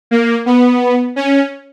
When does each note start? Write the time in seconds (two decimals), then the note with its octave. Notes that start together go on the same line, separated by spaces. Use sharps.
0.11 A#3
0.46 B3
1.16 C#4